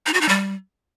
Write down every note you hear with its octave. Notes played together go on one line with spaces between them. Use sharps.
D#4
F#4
D#4
G3